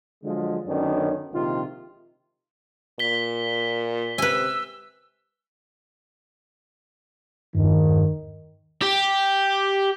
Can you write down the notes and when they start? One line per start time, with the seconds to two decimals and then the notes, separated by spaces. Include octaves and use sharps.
0.24 D3 F3 F#3 G#3
0.66 F#2 D3 D#3 B3 C#4 D4
1.33 A#1 C3 D#3 F3 G#3 F4
2.99 A#2 B6 G7
4.18 C3 B4 G#5 E6
7.55 E2 G2 D#3
8.82 G4